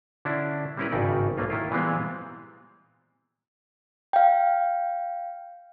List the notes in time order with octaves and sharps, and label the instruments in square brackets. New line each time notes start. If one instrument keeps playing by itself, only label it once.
[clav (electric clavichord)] D3 C#4 D4 E4
G3 C4 C#4 E4 A#4 B4
G#1 G2 C#3 D#4 D5
B1 A3 A#3 F4
D#3 E4 F4
A#2 E3 G3 G#3 B3 C4
[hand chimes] F5 G5